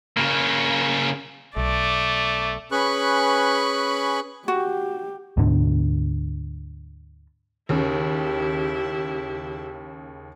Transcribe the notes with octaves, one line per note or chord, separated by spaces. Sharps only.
C#3 A#3
B1 A3 D5
C#4 G#4 B4 B5 C#6 F#6
F#4 G4
D2 G#2 B2 D3
D#2 C#3 E4 G4